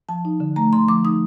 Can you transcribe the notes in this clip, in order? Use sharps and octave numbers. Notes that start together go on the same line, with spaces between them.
F3 A5
D#4
D3
A3 A#5
D3 C6
F3 D6
D#4 D#6